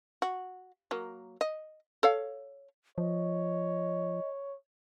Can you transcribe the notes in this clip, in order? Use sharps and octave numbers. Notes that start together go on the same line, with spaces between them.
F#4
F#3 A#3
D#5
A4 C#5 F5
F3 C#5 D#5